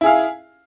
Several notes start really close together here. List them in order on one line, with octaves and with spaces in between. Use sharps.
E4 G#4 F5